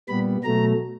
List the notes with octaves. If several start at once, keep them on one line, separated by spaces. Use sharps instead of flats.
A#2 G3 B3 B5
B2 F#3 A3 A#5